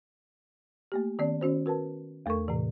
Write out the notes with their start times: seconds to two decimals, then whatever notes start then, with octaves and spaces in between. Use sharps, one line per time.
0.92 A3 A#3 G4
1.19 D#3 B3 C#4 D5
1.41 D#3 C#4 F#4 C5
1.66 F#4 A#4 B4 A5
2.26 E2 A3 A4 A#4 C#6
2.48 A2 C3 E3